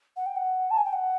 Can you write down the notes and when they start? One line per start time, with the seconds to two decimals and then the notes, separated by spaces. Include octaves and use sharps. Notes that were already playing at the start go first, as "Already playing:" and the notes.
0.17 F#5
0.26 G5
0.36 F#5
0.71 A5
0.78 G#5
0.85 G5
0.93 F#5